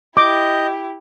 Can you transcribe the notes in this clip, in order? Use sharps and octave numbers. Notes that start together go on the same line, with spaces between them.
E4 G4 D#5 D6 G6